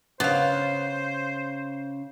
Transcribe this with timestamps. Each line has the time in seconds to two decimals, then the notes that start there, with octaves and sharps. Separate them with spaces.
0.20 C#3 B3 C5 F5